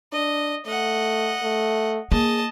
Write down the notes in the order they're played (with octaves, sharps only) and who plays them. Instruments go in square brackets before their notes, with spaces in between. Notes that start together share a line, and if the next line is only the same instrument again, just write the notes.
[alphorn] D4 [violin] D#5
[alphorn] A3 [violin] D#5 F#5
[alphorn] A3
[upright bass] A#3 [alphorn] G#4 [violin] D#5 A5